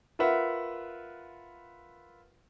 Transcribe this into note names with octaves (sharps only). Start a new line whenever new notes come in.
F4 A#4 B4 E5 F#5